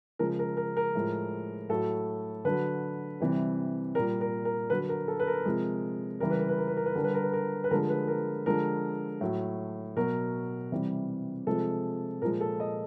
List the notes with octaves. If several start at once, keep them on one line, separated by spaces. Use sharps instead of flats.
C#3 F3 G#3 A#4
A#4
A#4
A#4
A2 F3 G#3
A2 F#3 A4
D3 F#3 B4
C3 E3 G3
A#2 G3 A#4
A#4
A#4
D3 F#3 B4
A#4
A4
B4
A#4
C3 F3 G#3
C#3 E3 G3 A#4
B4
A#4
B4
A#4
B4
A#4
B4
D3 G3 A#4
B4
A#4
B4
A#4
B4
D3 F3 G#3 A#4
B4
A#4
D3 F3 G#3 A#4
A2 F#3
B2 F#3 A#4
C3 E3 G3
C3 F3 G#3 A4
A#2 F3 G#3 A#4
A4
D#5